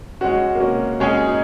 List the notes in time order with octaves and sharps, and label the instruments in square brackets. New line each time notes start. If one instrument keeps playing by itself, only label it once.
[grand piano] G#3 F#4 [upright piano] C#4
[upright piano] A#3
C#4
[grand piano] G#3 C#4 G#4 [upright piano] F#4
[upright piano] D#4